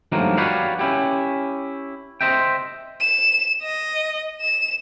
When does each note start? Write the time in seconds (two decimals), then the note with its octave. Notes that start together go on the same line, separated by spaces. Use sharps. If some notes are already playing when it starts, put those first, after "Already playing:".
0.12 G2 D#3 F3 F#3 A3 A#3
0.37 F#4 G4 B4 C#5 D5 F5
0.79 C#4 E4 G4
2.21 C5 D#5 E5 G5
3.01 E7
3.62 D#5
4.41 E7